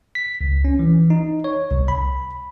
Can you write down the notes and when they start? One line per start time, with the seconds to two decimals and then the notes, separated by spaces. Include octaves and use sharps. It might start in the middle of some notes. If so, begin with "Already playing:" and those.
0.15 B6
0.41 C#2
0.65 C#4
0.79 E3
1.10 D#4
1.44 C#5
1.71 C2
1.88 B5